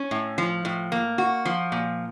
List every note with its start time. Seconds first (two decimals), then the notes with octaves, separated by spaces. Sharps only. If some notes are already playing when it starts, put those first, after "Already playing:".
Already playing: C#4
0.11 A2
0.38 F3
0.65 A2
0.92 A#3
1.18 F#4
1.45 F3
1.72 A#2